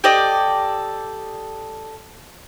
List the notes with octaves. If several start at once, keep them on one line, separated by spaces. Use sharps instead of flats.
G4 A4 D5 D#5